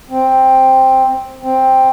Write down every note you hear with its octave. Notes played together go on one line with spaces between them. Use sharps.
C4
C4